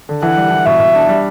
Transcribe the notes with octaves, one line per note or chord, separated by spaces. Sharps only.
D3
E3 F#5
G3
E3
B2 E5
B2
D4
G3